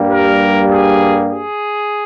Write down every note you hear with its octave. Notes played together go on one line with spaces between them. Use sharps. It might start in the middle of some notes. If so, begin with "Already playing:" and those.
Already playing: G2 G3 A#3
A#4
G#4
G#4